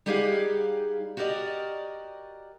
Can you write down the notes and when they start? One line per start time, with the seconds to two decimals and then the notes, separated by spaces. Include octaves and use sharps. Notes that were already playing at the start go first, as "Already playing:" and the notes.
0.06 G3 D#4 G4 G#4 F5 F#5
1.17 F#4 G4 A#4 D5 D#5